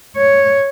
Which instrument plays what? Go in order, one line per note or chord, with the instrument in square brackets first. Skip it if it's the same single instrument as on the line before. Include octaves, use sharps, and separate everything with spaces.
[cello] C#5